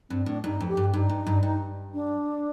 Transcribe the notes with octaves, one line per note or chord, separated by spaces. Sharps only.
G2 C4
A2 D4
G2 D#4
F2
G4
G2
G2 D#4
G2
G2
G2
D4